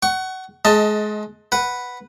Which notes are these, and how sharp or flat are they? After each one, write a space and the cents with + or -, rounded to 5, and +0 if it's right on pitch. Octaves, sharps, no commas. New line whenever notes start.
F#5 +25 C#6 -5
G#3 +30 D#5 +15 A5 +10
B4 +0 F#5 +0